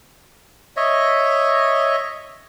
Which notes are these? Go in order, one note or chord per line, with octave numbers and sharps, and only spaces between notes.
C#5 D#5 E5